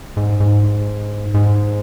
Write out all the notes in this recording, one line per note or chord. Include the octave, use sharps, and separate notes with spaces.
G#2
G#2
G#2